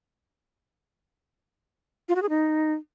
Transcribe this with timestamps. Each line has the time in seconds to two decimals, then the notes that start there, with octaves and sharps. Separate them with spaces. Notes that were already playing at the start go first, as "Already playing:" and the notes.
2.09 F4
2.16 F#4
2.22 G#4
2.29 D#4